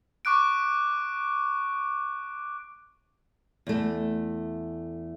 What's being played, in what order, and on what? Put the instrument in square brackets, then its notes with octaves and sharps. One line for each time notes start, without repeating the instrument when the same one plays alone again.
[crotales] C#6 D6 F#6 D7
[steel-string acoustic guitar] E2 A3